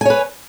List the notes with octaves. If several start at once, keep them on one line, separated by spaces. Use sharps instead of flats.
B4 C#5 G#5